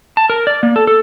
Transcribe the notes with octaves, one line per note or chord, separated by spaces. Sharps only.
A5
A#4
D5
A#3
A4
A4